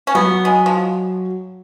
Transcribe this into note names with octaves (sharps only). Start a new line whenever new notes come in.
C#4
F#3 B3
G#3
F3